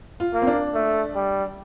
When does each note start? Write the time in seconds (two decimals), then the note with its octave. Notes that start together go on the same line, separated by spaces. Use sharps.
0.20 F4
0.33 A#3
0.42 C4
0.47 D4
0.74 A3
1.15 G3